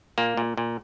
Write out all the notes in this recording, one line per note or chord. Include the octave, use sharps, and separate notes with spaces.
A#2 A#3
A#2
A#2